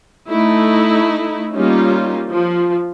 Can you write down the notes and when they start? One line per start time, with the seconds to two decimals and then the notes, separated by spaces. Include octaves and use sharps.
0.29 A3 D#4 E4
1.54 G3 A#3 C#4 D#4 F4
2.28 F3